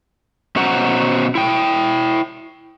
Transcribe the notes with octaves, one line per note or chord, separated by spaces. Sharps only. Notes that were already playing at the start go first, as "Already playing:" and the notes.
B2 C#4 F#4 C5 F#5 A#5
E4 G5